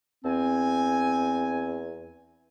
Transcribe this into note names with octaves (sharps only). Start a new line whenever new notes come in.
E2 C4 G#5